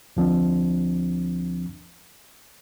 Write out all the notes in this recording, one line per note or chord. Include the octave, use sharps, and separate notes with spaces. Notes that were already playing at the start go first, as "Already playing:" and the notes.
D2 F3 C4 D4